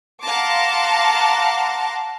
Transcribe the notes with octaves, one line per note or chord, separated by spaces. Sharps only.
F5 F#5 A5 A#5 C6 D6